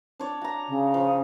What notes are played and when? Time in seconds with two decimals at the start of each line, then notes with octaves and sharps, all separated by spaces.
0.20 D4 C#5 D5
0.41 F#4 A#5
0.69 C#3
0.94 F3